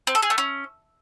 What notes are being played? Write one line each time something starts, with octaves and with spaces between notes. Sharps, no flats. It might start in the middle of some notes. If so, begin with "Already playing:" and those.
C4
A4
G#4
A3
C#4